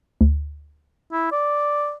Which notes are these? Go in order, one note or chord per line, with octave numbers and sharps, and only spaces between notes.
D2
E4
D5